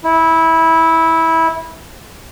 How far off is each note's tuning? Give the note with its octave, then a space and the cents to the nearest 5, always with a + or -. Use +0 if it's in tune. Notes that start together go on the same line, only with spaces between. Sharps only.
E4 -15